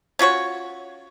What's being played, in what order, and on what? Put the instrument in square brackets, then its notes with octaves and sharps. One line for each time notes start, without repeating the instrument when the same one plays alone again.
[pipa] C#4 F4 F#4 C#5